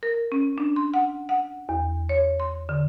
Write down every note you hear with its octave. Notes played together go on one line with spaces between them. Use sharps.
A#4
C#4
D4
C6
F#5
F#5
E2
C#5
C6
D3